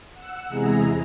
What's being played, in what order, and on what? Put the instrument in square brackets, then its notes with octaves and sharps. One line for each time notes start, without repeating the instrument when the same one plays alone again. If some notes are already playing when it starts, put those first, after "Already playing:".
[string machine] F#5 E6
E2 C3 G#3 E4 G#4 A#5